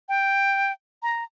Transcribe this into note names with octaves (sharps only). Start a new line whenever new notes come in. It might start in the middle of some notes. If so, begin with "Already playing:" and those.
G5
A#5